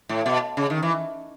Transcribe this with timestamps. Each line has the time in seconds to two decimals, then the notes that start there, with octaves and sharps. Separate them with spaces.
0.09 A2
0.26 B2
0.57 C#3
0.70 D#3
0.83 E3